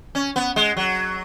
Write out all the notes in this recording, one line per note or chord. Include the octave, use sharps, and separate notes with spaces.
C#4
B3
G#3
F#3